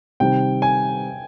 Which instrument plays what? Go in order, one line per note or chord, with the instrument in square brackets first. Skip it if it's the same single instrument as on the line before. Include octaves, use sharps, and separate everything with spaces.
[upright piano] C3 D#3 G3 C4 [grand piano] G5
[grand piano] G#5